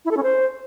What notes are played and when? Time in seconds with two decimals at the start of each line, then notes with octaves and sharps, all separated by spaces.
0.05 E4
0.11 A4
0.17 C#4
0.23 C5